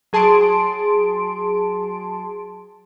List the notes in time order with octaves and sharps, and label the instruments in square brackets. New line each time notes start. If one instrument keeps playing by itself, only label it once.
[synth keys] F#3 G#4 A5 C6 D7